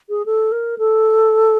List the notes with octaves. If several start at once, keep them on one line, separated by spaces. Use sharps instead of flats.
G#4
A4
A#4
A4